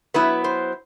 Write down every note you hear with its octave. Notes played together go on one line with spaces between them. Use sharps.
F#3 B3 E4 B4
C5